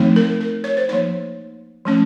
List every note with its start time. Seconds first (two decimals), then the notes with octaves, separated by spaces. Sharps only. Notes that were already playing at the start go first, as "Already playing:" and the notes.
Already playing: F3 A3 C4 D#4
0.16 A#4
0.41 A#4
0.64 C#5
0.77 C5
0.89 F3 A#3 D#4 C#5
1.85 F3 A3 C#4